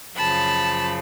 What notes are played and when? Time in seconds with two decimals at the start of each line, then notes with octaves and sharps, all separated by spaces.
0.16 F#2 C#3 F3 A5 B5